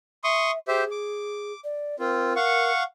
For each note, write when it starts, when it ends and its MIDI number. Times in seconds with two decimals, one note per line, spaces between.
0.24 0.58 76
0.24 0.51 84
0.24 0.51 85
0.24 0.51 87
0.68 0.84 67
0.68 1.52 68
0.68 0.84 72
0.68 0.84 76
0.91 1.60 86
1.64 1.98 74
1.99 2.33 60
1.99 2.33 65
1.99 2.71 70
2.36 2.83 77
2.36 2.83 78
2.36 2.83 85